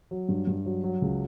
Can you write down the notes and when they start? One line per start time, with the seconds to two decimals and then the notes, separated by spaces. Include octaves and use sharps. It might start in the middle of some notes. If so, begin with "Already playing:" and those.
0.11 F#3
0.29 G2
0.47 G2
0.66 F#3
0.84 F#3
1.02 C#2